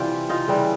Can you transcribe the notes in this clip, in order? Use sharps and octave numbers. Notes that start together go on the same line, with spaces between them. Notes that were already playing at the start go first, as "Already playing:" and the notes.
Already playing: C3 E3 G3 F4 G4
D#4 F4
C#3 E3 G3